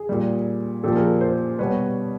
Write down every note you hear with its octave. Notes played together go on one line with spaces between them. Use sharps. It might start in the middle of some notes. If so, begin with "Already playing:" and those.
Already playing: G#4
A#2 G3
A#2 F3 G4 A4
G#4 A#4
A#4 C5
B2 G3 B4 C#5